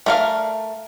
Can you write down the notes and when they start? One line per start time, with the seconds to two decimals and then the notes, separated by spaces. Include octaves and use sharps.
0.06 A3 A#4 F5